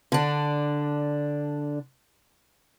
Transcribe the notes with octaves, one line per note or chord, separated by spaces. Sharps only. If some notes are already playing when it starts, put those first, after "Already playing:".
D3 D4